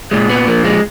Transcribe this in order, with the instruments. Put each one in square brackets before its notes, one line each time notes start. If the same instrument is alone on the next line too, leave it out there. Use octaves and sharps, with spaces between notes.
[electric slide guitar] A#2 G#3
B3
F3 A#3
G#3